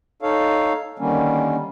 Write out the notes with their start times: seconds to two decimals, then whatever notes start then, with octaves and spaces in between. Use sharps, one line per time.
0.22 D#4 A4 C#5 F5
0.99 D3 D#3 G3 A#3 C#4